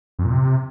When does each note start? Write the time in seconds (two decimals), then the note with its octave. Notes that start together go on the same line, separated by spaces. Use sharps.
0.19 F2
0.25 A#2
0.31 C3